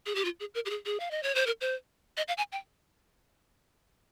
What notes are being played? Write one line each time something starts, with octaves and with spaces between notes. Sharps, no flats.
G#4
G4
F4
G#4
A#4
G4
G#4
G#4
F5
D#5
C#5
C5
A#4
C5
D#5
F5
G#5
G5